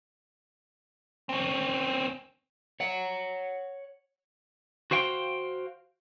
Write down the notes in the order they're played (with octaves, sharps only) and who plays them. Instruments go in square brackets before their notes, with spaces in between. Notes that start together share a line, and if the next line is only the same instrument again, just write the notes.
[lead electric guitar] C4 C#4
[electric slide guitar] C#5 F#5
[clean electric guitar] F#4 C5 F5 G5